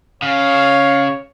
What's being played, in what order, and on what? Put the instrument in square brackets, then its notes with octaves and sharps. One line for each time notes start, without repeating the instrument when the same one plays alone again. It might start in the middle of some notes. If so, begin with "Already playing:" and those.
[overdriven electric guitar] C#3 [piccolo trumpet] C#5 [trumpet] F5